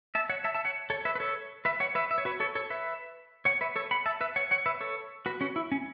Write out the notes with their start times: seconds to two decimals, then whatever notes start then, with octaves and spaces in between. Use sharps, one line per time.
0.15 E5 A5
0.29 C#5 F#5
0.44 E5 A5
0.55 E5 A5
0.65 C#5 F#5
0.90 A4 C#5
1.05 B4 E5
1.15 B4
1.20 A4 C#5
1.65 B4 E5
1.80 C#5 F#5
1.95 B4 E5
2.11 E5
2.18 C#5
2.25 F#4 B4
2.40 A4 C#5
2.55 A4 C#5
2.70 B4 E5
3.45 C#5 F#5
3.61 B4 E5
3.76 A4 C#5
3.91 F#5 B5
4.06 E5 A5
4.21 B4 E5
4.36 C#5 F#5
4.51 C#5 F#5
4.66 B4 E5
4.81 A4 C#5
5.26 F#4 B4
5.41 C#4 F#4
5.56 E4
5.72 C#4